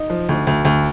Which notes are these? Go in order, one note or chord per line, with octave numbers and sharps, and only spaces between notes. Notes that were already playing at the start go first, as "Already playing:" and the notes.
Already playing: D#4
F3
D2
D2
D2